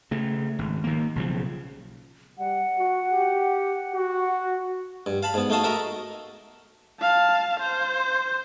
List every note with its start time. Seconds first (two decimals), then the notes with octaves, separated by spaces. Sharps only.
0.11 C#3 A3
0.59 G#1
0.84 D#3 A#3
1.16 B1 C#3 F3
2.39 G3 F#5
2.78 F#4
3.12 G4
3.95 F#4
5.06 G2
5.23 F5 A5 B5
5.34 G#2 B3
5.50 A3 D#4 F#4 F5 A5 D#6
5.64 F#4 A4 A#4 D#5 E5 A#5
7.01 F5 A5
7.60 C5